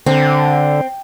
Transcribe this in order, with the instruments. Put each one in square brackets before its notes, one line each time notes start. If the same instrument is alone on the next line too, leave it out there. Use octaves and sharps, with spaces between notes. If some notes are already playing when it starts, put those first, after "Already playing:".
[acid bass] D3 [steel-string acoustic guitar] C4